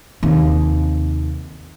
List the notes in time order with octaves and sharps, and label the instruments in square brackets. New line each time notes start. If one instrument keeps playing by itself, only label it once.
[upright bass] D#2 C3